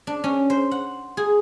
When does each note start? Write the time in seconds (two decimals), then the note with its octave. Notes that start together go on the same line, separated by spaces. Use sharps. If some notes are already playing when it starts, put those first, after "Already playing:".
0.07 D4
0.24 C#4
0.50 C5
0.71 F#5
1.17 G#4